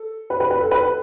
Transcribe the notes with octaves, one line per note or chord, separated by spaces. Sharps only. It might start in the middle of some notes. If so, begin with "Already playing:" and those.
Already playing: A4
B4
B4
B4
A4
B4